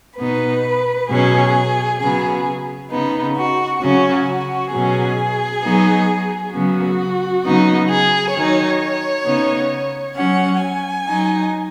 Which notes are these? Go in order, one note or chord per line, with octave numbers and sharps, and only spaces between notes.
B2 B3 D#4 B4
B2 F#3 C#4 G#4
C#3 F#3 B3 G#4
C#3 B3 D#4
F#4
C#3 F#3 C#4 F#4
B2 F#3 C#4 G#4
F#3 B3 D#4
C#3 F#3 B3 F#4
C#3 F#3 B3 D#4
G#4
D#3 F#3 D#4 C#5
C#3 B3 D#4
F#3 C#4 F#5
G#5
F#3 D#4